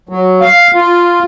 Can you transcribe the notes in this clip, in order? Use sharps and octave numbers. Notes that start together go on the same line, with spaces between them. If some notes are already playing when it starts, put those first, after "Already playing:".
F#3
F5
F4